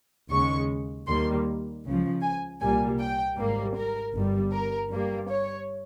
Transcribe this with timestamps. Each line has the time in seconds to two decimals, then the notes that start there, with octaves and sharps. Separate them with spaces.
0.31 D#2 C#3 G#3 C#6
1.07 D#2 D#3 G3 A#3 C6
1.84 C#2 C#3 F3
2.22 G#5
2.60 C2 A#2 G3 A#3 G#5
2.99 G5
3.36 G#1 G#2 G3 A#3
3.76 A#4
4.13 G1 G2 G3
4.52 A#4
4.89 G2 G3 A#3
5.28 C#5